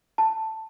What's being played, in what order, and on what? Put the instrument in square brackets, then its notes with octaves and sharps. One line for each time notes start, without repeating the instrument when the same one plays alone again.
[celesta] A5